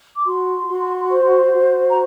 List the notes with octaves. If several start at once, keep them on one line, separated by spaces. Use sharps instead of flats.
D6
F#4 C6
F#4
C5
F#4
A#5